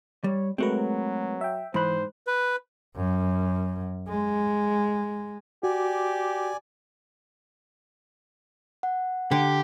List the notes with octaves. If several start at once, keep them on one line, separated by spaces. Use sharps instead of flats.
G3 C#5
F#3 G#3 A3 C4 F#4 A#4 B4
E5 G5
G#2 E3 C5 B5 F#6
B4
F#2
G#3
F#4 G4 D5 G#5
F#5
D3 G4